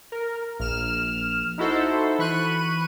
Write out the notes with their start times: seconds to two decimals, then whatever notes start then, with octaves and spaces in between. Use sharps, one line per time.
0.12 A#4
0.59 A#1 F6 E7
1.58 D#4 E4 F#4 A4 C5
2.19 E3 B5 C#6 F#6 D#7